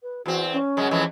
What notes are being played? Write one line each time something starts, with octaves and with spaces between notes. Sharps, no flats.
B4
E2 C4 F#4
C#4
F#2 C#3 G#3
F2 E3 G#3